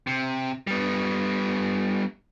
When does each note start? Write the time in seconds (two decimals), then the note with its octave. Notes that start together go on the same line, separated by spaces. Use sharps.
0.07 C3
0.67 G3 B3